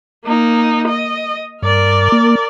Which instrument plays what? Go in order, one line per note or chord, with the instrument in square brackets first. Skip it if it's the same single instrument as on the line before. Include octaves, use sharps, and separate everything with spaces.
[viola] A#3 D#4
D#5
[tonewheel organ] G2 [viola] A#4 D5
[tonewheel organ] A#3